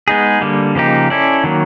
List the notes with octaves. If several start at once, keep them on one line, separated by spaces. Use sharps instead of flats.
G#3 B3 D#4 G#4
D3 G3 A#3
C#3 F3 A#3 D#4 G4
C#4 E4 A4 D5
D#3 F#3 A#3